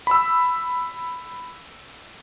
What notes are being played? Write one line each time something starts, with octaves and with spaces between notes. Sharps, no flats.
B5 E6